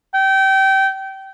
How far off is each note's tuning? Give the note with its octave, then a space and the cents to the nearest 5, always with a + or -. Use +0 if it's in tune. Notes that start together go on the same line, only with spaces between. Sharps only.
G5 -25